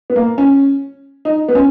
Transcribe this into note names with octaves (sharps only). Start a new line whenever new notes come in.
B3
A#3
C#4
D#4
B3
C#4